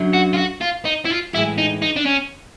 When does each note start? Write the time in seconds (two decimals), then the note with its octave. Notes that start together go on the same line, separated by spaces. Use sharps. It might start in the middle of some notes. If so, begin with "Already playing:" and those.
Already playing: F#2 D3 F#3
0.14 F#4
0.34 F4
0.38 F#4
0.61 F4
0.85 D#4
1.05 E4
1.10 F4
1.33 A2 E3 G#3 E4
1.58 D#4
1.82 D#4
1.97 D4
2.06 C#4